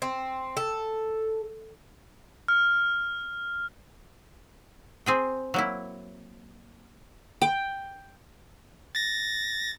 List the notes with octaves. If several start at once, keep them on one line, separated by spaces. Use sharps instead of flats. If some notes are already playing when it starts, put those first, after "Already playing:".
C4
A4
F6
C4 G#4 G5
F#3 A#3 E4
G5
A6 A#6